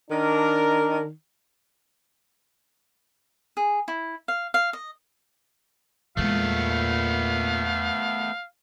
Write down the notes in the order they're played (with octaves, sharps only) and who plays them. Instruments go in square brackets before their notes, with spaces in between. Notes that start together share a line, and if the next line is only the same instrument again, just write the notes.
[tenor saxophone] D#3 [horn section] D4 A#4
[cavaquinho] G#4
E4
F5
F5
D#5
[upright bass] E2 G#3 [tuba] A#2 [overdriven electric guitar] A3 B3 [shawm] F5